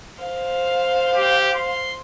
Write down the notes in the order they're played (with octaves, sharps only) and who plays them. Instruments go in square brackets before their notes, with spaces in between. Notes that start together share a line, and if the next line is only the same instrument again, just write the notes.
[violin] C5 F5
[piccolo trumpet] G4
C6